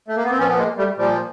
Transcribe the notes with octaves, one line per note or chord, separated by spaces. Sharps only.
A3
A#3
B3
C4
A#2 F3 B3 C#4
B3
G#3 A#3
G3 A3
A#2 F3 G3